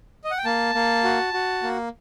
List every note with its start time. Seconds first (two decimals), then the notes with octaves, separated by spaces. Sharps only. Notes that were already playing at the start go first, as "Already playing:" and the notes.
0.24 D#5
0.31 F#5
0.38 G5
0.45 A#3 A5
0.75 A#3
1.04 F#4
1.34 F#4
1.63 A#3